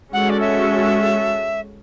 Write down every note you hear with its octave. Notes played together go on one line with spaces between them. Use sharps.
G#3 C#4 F#4 A4 F#5
D5
E5